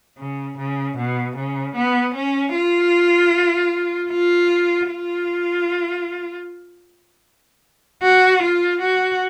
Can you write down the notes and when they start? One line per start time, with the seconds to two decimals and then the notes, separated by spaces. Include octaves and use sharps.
0.18 C#3
0.58 C#3
0.98 B2
1.37 C#3
1.76 B3
2.15 C#4
2.55 F4
4.11 F4
4.90 F4
8.02 F#4
8.43 F4
8.81 F#4